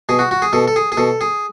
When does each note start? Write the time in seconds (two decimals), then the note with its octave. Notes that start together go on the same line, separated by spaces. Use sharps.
0.09 B2 G#4
0.19 F#4
0.31 F#4
0.42 G#4
0.53 B2 A4
0.68 A4
0.76 G#4
0.92 G#4
0.97 B2 A4
1.21 G#4